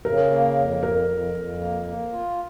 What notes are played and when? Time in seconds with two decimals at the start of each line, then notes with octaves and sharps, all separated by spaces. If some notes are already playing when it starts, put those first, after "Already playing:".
0.05 C#3 A#4
0.30 A#3
0.56 F2
0.82 F2 A#4
1.08 F2
1.34 F2
1.59 A#3
1.85 A#3
2.11 F4